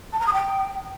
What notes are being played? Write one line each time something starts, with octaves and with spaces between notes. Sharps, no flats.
A5
A#5
D#6
G5